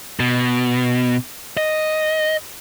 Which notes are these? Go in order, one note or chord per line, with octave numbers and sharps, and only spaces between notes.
B2
D#5